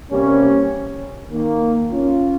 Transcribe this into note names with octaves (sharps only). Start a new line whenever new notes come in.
C3 G3 A#3 C#4
D#3 A#3
C#4 F4